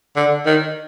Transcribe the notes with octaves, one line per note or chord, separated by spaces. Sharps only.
D3
D#3